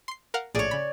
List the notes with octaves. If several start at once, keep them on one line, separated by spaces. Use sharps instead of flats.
C6 C7
A#4 F5 F#5
A#1 A2 G#4 C#5 D5
C#3 B5